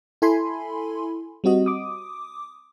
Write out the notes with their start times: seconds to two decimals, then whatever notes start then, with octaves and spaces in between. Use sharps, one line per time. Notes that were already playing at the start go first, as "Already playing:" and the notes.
0.22 E4 A4 G#5 B5 C6
1.44 G3 C4 F#4 D#5
1.66 D6 D#6